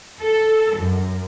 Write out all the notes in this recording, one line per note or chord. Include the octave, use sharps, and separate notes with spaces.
A4
F#2